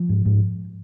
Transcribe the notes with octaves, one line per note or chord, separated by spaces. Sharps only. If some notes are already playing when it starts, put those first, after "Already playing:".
Already playing: F3
G#2
G#2